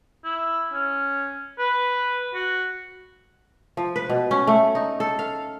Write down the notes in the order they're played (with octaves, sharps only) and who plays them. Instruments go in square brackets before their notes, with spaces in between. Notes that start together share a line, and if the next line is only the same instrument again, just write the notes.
[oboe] E4
C#4
B4
F#4
[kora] F3
B4
B2
C#4
A3
D#4
A4
F5